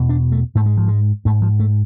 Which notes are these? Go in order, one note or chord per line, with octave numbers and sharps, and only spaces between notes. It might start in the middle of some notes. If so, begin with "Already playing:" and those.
Already playing: E2 B2
D4
A3
G#2 A3
G#3
F3
G#3
G#2 A3
F3
A3